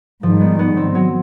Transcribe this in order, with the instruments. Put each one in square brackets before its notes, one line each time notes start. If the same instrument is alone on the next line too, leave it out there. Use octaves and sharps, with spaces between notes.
[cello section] G#2 D#3 G3 [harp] F3
[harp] B3
B3
C4
F#3